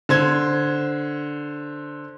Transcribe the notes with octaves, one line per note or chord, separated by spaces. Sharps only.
D3 C5 G#6